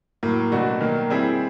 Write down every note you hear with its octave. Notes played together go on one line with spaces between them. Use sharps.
A2 F#3 A#3
B2 F#3 A3 D4 F#4
D#3 F#3 A#3
G3 C4 E4 G#4